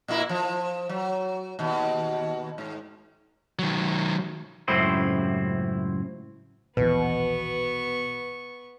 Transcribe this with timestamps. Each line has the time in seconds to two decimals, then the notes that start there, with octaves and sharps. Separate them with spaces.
0.08 A#2 A#3 E4
0.29 F3
0.89 F#3
1.59 D#2 B2
2.58 G#2
3.59 D#3 F#3
4.68 C#2 F#2 A2 C4 E4 C5
6.77 A#1 D#2 B2 E3 B3 B4 C#6